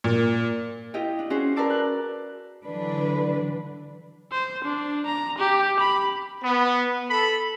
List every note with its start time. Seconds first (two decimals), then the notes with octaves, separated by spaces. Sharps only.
0.04 A#2
0.94 E4 F4 G4 D#5
1.19 D4
1.30 C#4 F#4 G#4 C5
1.56 A#4 B4 D5 A5 D6 E6
1.70 F#6
2.64 D3 E3 F#3 D4 B4
4.32 C5
4.64 D4
5.06 A#5
5.38 G4
5.80 B5
6.43 B3
7.10 A4 B5